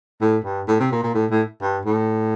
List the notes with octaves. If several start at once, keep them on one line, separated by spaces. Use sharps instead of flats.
A2
G2
A2
C3
A#2
A#2
A2
A2
G2
A2